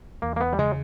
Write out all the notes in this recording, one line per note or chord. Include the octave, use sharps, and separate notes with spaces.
E2 A#3
A#3
B3
G3
C#3 G#3